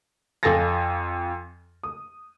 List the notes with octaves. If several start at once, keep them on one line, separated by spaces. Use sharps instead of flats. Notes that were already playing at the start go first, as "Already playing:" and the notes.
F2 F4 A4 G#5 A6 A#6
D#6